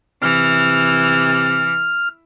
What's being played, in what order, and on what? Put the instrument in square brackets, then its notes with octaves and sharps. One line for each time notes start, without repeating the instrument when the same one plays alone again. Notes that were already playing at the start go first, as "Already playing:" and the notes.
[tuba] C3 [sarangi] E3 [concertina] F6